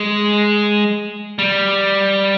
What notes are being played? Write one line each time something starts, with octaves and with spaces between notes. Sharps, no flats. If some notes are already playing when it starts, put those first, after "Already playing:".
Already playing: G#3
G3